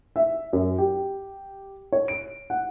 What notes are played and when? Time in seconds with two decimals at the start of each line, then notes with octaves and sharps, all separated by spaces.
0.16 E5
0.53 F#2
0.78 G4
1.92 C#5
2.08 D7
2.50 F#5